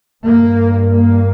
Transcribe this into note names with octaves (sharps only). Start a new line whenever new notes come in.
G2 A#3
A#3